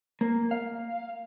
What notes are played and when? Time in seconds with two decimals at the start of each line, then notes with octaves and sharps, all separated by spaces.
0.21 A#3
0.51 F5